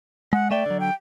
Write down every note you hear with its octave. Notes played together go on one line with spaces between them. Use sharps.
G#3 F#5
A3 D5 E5 G5
D3 F#3
G5